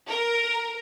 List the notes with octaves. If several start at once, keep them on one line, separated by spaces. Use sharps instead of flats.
A#4